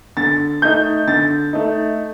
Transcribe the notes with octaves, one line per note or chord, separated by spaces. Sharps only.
D3 A6
A3 D#4 G6
D3 A6
A3 D#4